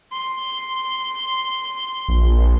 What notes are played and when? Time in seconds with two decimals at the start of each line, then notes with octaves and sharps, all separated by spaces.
0.12 C6
2.08 A#1